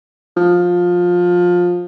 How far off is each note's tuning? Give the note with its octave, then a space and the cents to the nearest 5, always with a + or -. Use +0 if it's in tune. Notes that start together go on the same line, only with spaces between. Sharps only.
F3 +20